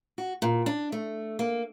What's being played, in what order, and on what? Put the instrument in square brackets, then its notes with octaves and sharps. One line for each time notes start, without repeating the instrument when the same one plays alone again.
[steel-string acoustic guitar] F#4
A#2
D4
A3
A#3